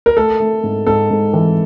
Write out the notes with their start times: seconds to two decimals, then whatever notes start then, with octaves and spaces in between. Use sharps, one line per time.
0.06 A#4
0.17 A3 A4
0.40 A3
0.64 G#2
0.87 G#2 A4
1.11 G#2
1.33 E3